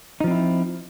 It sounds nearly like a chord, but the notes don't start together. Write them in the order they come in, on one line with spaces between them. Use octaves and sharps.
D#4 F3 C4 E4